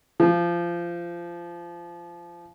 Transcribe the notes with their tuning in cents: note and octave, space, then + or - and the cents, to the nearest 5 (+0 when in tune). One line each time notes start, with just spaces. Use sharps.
F3 -20